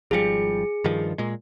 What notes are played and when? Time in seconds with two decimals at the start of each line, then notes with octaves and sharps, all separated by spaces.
0.11 G#1 F3 G3 G#4 C#7
0.84 G2 D#3 F3
1.18 A#2 G#3